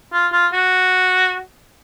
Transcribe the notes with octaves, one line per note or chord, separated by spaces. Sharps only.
F4
F4
F#4